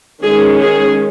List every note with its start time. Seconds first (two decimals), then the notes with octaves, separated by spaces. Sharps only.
0.23 D#3 G#3 C#4 G#4
0.61 G#4